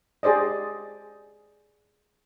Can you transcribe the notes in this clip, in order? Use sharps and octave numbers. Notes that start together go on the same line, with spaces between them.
G4 G#4 C5 D5 D#5